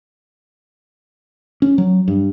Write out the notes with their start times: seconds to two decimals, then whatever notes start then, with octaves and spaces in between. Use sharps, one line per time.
1.62 C#4
1.78 F#3
2.08 G2